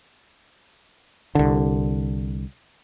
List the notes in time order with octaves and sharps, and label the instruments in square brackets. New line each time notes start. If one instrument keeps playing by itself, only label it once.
[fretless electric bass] C2 D3